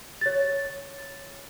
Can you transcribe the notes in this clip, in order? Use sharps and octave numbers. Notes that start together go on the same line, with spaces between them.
C#5 A6